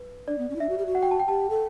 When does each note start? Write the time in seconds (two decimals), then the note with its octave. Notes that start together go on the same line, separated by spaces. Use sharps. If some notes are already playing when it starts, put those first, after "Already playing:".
Already playing: B4
0.28 D4 D5
0.38 B3
0.50 C#4
0.56 E4
0.60 D4 E5
0.69 F#4
0.78 G4
0.86 F#4
0.95 F#5
1.03 G5
1.11 A5
1.20 G5
1.28 G4 A5
1.50 A4